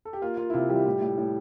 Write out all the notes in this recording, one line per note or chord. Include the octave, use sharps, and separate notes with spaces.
A4
G4
A#3 F4
A#3 F4
E4
C3 F4
E3 G3 G4
A2
A2
A2